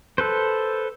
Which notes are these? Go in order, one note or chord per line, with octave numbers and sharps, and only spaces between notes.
A4 B4 C5